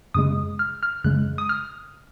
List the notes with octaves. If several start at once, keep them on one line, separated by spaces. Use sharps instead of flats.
F#2 C#3 G#3 D#6
F6
F6
F#2 C#3 G#3 F#6
D#6
F6